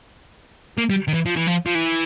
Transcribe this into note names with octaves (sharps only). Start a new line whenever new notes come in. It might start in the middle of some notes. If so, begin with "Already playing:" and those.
A#3
G3
D#3
E3
F3
E3
F3
F3
E3